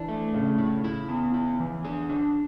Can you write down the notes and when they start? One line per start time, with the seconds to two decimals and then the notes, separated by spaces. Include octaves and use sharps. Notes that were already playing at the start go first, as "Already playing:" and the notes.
Already playing: E3 D4
0.08 A3
0.34 A2 C#3
0.58 E4
0.84 E4
1.09 B3
1.34 E4
1.60 E3
1.85 D3 G#4
2.09 D3 D4